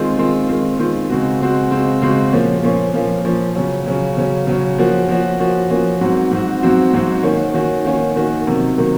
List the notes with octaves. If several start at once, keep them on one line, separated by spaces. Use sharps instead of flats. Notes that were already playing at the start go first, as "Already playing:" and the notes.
Already playing: D#3 G#3 C4 F4
D#3 G#3 C4 F4
D#3 G#3 C4 F4
D#3 G#3 C4 F4
C#3 G#3 C4 F#4
C#3 G#3 C4 F#4
C#3 G#3 C4 F#4
C#3 G#3 C4 F#4
A#2 F3 A#3 C#4
A#2 F3 A#3 C#4
A#2 F3 A#3 C#4
A#2 F3 A#3 C#4
C#3 F#3 C#4
C#3 F#3 C#4
C#3 F#3 C#4
C#3 F#3 C#4
F3 A#3 C#4 F#4
F3 A#3 C#4 F#4
F3 A#3 C#4 F#4
F3 A#3 C#4 F#4
G#2 F#3 C4 F#4
G#2 F#3 C4 F#4
G#2 F#3 C4 F#4
G#2 F#3 C4 F#4
D#3 A#3 C#4 F#4
D#3 A#3 C#4 F#4
D#3 A#3 C#4 F#4
D#3 A#3 C#4 F#4
C3 D#3 F#3 A#3
C3 D#3 F#3 A#3